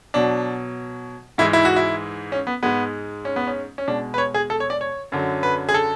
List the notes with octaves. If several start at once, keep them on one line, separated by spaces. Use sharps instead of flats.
B2 F#3 D4
G#2 E3 G#3 E4
E4
F#4
E4
C#4
B3
G#2 G#3 B3
C#4
B3
C#4
C#4
B2 G#3 D4
B4
C#5
G#4
A4
C#5
D5
C#5
F#2 D3 F#3
B4
G#4
A4